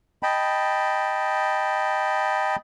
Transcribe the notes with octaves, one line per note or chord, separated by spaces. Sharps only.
D#5 G5 A5 B5